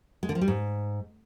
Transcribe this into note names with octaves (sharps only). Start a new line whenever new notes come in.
G#3
D3
F3
G3
G#2